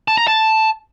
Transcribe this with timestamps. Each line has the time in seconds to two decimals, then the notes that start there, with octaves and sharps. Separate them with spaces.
0.08 A5
0.18 A#5
0.27 A5